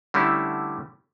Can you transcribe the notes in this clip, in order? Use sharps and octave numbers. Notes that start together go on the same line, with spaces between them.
D3 G3 A3 C#4 E4